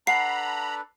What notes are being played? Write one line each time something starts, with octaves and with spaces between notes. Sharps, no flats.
D4 A4 B4 F#5 A#5 B5 C7